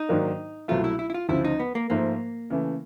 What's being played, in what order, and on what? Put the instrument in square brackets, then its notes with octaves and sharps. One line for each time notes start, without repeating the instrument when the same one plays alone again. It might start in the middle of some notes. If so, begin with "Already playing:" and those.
Already playing: [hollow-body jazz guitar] D#4
[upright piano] G#2 D#3 F#3 A#3 D4
[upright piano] C2 B2 F#3 A3 [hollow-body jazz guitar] F4
[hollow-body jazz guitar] E4
E4
E4
F4
[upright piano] D2 C#3 F3 [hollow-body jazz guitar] E4
[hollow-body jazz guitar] D#4
B3
A#3
[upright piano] G#2 F3 A3 [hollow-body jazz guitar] A#3
[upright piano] C#3 E3 A3